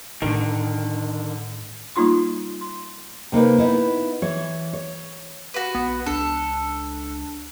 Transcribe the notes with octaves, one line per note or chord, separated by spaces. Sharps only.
A2 D3 D#3
G3 A#3 D#4 F4 C6
C6
C3 A#3 D#4 B4
B3 D#4 E4
E3 C#5
C#5
F#4 B4
A#1 B3
C#2 D4 A4